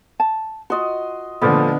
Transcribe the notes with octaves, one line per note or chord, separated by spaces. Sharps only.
A5
F4 F#4 D#5 C6
A#2 D3 F3 A3 B3 D5